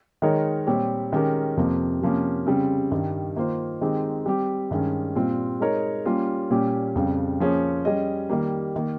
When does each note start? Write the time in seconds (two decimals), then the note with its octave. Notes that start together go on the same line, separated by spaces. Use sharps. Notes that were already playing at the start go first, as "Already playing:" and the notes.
0.22 D#3 G#3 D#4 A#4 C#5
0.67 A#2 G3 C4 G4 C#5
1.13 D#3 G#3 C#4 G4 A#4
1.57 F2 C3 F3 A#3
2.01 C3 F3 A#3 C#4
2.47 C#3 G3 C4
2.92 G2 D#3 G3
3.36 D#3 A#3 F4 C5
3.81 D#3 G#3 C4 D#4 G4
4.26 G3 C4 G4
4.71 G2 D#3 G#3 C#4
5.15 A#2 G3 C4 F4
5.60 G#3 D#4 A#4 C#5
6.05 G3 A#3 C#4 F4
6.50 A#2 G3 C#4 G4
6.95 F2 C#3 G3
7.40 F3 A#3 C#4 G#4 C#5
7.85 G3 C#4 G#4 D#5
8.30 D#3 G3 A#3
8.76 D#3 A#3